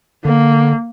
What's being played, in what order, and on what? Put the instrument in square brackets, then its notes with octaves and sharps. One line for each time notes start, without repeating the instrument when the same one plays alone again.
[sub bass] D3 [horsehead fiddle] A#3